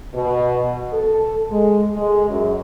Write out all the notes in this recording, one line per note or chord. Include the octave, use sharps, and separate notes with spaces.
B2
A4
G#3
G#3
F#2